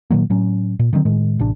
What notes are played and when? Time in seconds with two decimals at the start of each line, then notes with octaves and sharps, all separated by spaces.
0.10 A#2 D#3 F#3 A#3
0.30 A2 F#3 C#4
0.79 A#2
0.93 D3 D#3 F#3 C4
1.05 A2 D#3 G#3
1.39 A1 C3 D4